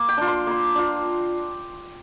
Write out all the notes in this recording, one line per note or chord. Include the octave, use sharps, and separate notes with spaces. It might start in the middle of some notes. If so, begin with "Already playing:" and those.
Already playing: A#3
G5
D4 F4
C6
A#3 C6
D4 F4